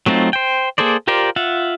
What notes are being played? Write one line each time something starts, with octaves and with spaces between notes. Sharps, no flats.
F#3 A3 C4 D#4 F4
C5 G5
A#3 G#4 A4 C5 D5
F4 G4 A#4 C5 D5
F4 E5 F#5